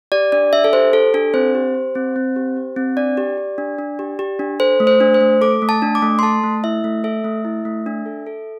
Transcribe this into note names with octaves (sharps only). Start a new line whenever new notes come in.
G4 D5
D4 D5
D4 E5
A4
G4 C5
G4 A4
D4 A4
C4 C5
G4
G4
C4
C4
G4
G4
C4
D4 D5
G4
G4
D4
D4
G4
G4
D4
A4 C5
A3
C5
D4
C5
A3
A4 D6
A3
A5
D4
D6
A3
C6
A4 A5
A3
E4 E5
A3
A4 E5
A3
E4
A3
D4
A4
A4